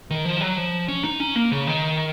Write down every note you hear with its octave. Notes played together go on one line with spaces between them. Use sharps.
D#3
F3
F#3
F3
C#4
D#4
C#4
A#3
C#3
D#3